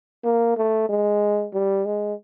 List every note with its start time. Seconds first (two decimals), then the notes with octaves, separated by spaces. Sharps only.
0.24 A#3
0.57 A3
0.89 G#3
1.53 G3
1.85 G#3